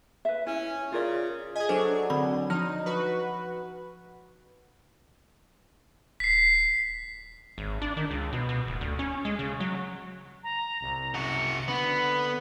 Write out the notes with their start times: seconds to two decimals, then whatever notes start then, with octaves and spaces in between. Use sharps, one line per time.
0.25 B4 E5
0.47 C#4 E4
0.92 C#3 F4 A#4 D5
1.56 G#4 D#5 G#5
1.69 F#3 D4 A4 C5 G#6
2.10 D3 C4 B5
2.50 F3 D#4 F6
2.86 F#4 B4
6.20 D#1 B6 C7
7.58 G#1
7.82 D4
7.97 D#3
8.11 C#2
8.33 B2
8.49 B2
8.67 D1
8.81 D2
8.99 C#4
9.25 G#3
9.39 C#3
9.60 F#3
10.44 A#5
10.81 C2
11.14 C#3 F#4 C#7
11.68 D3 B3 B5